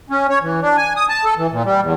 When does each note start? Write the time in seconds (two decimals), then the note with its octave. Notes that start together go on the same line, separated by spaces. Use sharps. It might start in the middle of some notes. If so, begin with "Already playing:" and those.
0.10 C#4
0.30 C#5
0.42 E3
0.62 D4
0.77 G#5
0.96 D#6
1.09 A5
1.25 A4
1.37 E3
1.51 A#2
1.65 G3
1.82 E2